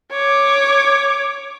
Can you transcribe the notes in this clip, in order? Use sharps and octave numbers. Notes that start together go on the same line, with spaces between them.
C#5 D6